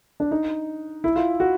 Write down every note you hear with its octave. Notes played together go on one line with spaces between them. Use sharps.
D4
D#4
E4
F4
F#4